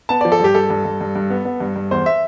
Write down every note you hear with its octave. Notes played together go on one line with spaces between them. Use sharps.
B3 A5
F3 D5
A4
G2 G4
G2 A4
G2
G2
G2
G2
B3
B3
G2
G2
E2 C5
E5